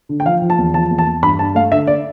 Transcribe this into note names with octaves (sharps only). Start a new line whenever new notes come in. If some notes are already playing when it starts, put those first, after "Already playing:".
D3
G5
F3 F5
F3
A5
E2
F3 A5
E2
A5
E2
G2 B5
G2 A5
A3 F5
D3 E5
D5